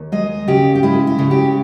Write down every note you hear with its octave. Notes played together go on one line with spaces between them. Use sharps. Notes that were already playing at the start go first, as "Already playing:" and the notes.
Already playing: D#2
G#3 D#5
C#3 G4
G4
G#3 E4
E4
C#3
G4